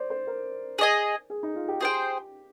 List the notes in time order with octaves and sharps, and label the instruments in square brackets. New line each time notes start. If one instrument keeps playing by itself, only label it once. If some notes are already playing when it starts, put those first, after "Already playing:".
Already playing: [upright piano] C5 D5
C5
A#4
[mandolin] G#4 D#5 G#5
[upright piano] G#4
D#4
F4
G4
[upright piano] G4 [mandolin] G#4 C5 G5